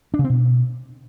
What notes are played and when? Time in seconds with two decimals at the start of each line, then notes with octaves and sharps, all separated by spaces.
0.14 D4
0.19 C#3
0.24 C4
0.30 B2